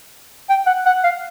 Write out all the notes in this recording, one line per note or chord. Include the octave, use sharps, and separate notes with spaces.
G5
F#5
F#5
F5